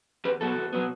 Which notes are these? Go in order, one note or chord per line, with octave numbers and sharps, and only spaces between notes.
E2 G4 B4
B2 F#3 B3 F#4 A4
E2
B2 F#3 B3